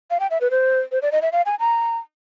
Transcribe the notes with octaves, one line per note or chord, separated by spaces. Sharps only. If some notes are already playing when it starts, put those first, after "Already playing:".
F5
G5
E5
B4
C5
C5
D5
D#5
E5
F5
G#5
A#5